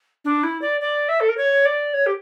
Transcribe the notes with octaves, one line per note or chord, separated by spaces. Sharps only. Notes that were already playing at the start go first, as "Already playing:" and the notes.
D4
E4
D5
D5
E5
A4
A#4
C#5
D5
C#5
G4